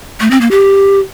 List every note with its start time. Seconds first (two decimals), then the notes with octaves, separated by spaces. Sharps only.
0.21 A3
0.31 C4
0.41 A#3
0.51 G4